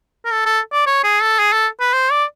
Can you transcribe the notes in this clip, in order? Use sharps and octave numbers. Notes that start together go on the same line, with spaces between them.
A#4
A4
A4
D5
C#5
G#4
A4
G#4
A4
B4
C5
D5